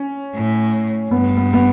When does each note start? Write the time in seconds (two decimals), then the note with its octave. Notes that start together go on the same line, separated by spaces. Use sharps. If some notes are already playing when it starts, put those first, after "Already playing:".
Already playing: C#4
0.35 A2
1.11 G2 B3
1.37 B3
1.53 B3